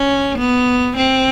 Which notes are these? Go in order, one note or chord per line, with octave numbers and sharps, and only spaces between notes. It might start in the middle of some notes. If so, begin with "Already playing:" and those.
Already playing: C#4
B3
C4